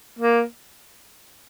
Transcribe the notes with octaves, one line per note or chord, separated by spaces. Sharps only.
A#3